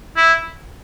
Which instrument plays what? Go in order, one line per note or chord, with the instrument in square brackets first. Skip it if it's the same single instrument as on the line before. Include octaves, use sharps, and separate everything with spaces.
[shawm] E4